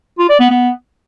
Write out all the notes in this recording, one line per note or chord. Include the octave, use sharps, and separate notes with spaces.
F4
D5
B3
B3